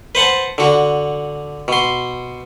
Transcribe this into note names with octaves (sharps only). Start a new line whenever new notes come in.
B4 C5 F#5 A5
D3 F#4
B2 C6